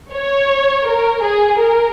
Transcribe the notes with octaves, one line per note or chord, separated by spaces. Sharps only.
C#5
A#4
G#4
A#4